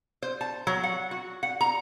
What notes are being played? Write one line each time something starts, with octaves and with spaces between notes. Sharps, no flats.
C5
A5
F#3
F#5
F#4
F#5
A#5